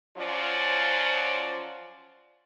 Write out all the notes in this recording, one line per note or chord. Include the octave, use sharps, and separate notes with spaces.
F3 F#3 C#4 F4 C5 D5